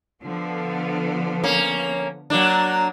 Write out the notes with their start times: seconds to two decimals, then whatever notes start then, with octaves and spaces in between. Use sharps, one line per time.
0.23 D3 F3 B3
1.44 A#3 C#4
2.30 F#3 A#3 D4